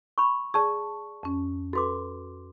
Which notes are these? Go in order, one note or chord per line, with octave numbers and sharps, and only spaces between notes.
B5 C#6
G#4 D5 A5 C#6
F2 C#4
F#4 A4 B4 C6 D6